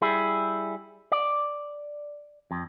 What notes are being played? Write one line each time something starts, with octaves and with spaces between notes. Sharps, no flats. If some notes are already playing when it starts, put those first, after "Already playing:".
G3 E4 G#4
D5
F2